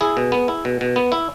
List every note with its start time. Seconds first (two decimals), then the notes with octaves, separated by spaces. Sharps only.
0.01 E4 G#4
0.17 B2
0.32 B3
0.48 E4
0.65 B2
0.81 B2
0.96 B3
1.12 E4